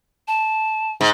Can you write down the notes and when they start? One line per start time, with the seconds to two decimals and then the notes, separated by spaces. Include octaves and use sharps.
0.28 A5
1.01 G#2